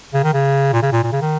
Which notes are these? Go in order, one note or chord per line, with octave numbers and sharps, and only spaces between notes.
C#3
D#3
C#3
A#2
C#3
A#2
A#2
C#3
D#3